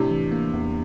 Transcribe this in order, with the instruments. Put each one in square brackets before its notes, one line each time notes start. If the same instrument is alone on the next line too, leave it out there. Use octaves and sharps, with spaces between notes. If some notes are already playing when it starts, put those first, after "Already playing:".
Already playing: [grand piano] A2 C3 [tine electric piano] D4
[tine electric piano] E3
A#3
E2